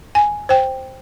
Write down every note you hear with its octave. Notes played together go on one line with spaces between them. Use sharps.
G#5
C5 G5